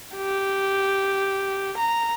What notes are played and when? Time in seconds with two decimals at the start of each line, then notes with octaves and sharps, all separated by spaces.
0.16 G4
1.77 A#5